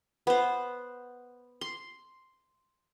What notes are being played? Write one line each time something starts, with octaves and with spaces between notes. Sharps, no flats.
B3 C5
C6